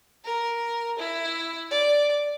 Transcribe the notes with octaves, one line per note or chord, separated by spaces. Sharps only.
A#4
E4
D5